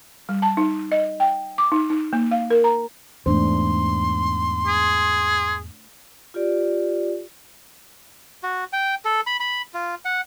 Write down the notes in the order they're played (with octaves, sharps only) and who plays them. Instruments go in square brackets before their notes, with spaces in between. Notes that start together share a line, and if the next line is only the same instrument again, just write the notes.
[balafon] G3
A5
D#4
D#5
G5
D6
D#4
D#4
A#3
F5
A#4
A#5
[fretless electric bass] E2 G#2 [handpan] A3 D4 C5 [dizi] C6
[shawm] G#4
[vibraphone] F4 G4 D5
[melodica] F#4
G5
A4
B5
B5
F4
F#5